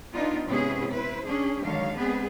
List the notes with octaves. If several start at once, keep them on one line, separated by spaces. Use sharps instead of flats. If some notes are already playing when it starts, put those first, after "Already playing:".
B3 D4 D#4 F4
G#2 C3 B3 C#4 E4 G#4
E4 B4 C5
C#4 D4 G#4
D3 D#3 F#3 G#3 C#5 F5
G#3 B3 C4 G#4 B4